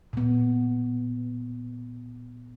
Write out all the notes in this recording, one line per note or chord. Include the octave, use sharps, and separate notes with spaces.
A#2 B3